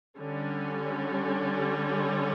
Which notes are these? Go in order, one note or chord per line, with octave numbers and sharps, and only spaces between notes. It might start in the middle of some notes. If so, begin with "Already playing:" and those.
D3 G3 C#4